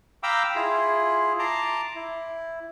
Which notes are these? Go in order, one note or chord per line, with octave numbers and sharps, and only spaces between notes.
F5 G5 A#5 B5 D6 E6
E4 F4 G#4
A5 A#5 C6 D6
E4